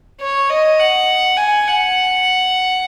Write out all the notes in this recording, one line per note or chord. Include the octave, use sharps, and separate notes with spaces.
C#5
D#5
F#5
G#5
F#5